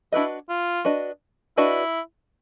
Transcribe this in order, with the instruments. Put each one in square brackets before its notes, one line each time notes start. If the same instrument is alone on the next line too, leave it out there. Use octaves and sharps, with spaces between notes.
[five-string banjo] D4 F#4 B4 D#5 [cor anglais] E4
[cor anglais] F4
[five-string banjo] D4 F#4 B4 D#5
[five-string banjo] D4 F#4 B4 D#5 [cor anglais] E4